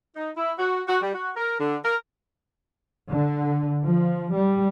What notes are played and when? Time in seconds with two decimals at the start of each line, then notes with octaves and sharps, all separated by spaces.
0.16 D#4
0.37 E4
0.59 F#4
0.88 F#4
1.02 G3
1.13 F#4
1.37 A#4
1.60 D3
1.84 A#4
3.11 D3
3.85 F3
4.34 G3